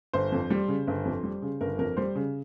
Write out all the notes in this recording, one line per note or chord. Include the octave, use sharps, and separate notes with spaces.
G1 C5
F2
G3
C#3
G1
F2
G3
C#3
G1 A#4
F2 A#4
G3 C5
C#3